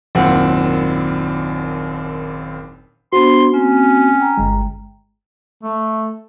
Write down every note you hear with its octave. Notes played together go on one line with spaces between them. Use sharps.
F#1 D#2 A#2 C4 F#5
B3 D4 F#4 C5 C6
A#3 C4 C#4
G5 A#5
G1 G#3
A3